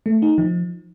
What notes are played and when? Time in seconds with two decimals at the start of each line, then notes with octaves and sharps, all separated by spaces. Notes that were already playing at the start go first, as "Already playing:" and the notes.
0.06 A3
0.22 D#4
0.38 F3